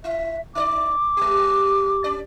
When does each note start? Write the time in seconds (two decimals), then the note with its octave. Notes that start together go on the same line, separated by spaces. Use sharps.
0.04 E4 E5
0.55 D#4 C#5 D5 D6
1.17 G#3 G4
2.04 C#4 D5